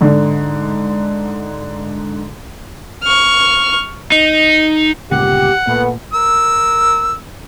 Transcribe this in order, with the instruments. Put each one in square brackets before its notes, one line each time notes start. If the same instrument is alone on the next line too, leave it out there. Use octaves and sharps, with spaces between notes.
[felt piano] G#2 D3
[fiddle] C#6 F6
[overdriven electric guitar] D#4
[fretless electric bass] G1 C#2 A#2 [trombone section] G4 [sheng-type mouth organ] F#5
[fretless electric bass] A#2 [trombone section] A3 B3
[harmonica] A#4 E6